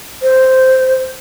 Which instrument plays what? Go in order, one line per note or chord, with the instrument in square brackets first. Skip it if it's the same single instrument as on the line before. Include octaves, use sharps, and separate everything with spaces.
[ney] C5